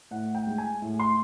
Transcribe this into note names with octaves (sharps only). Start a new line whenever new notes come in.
A2 F#5
G5
G#3
G#5
A2
C6